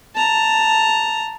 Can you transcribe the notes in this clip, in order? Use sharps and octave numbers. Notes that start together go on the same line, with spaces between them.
A5 A#5